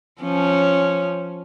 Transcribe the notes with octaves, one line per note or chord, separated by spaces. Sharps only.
F3 C#4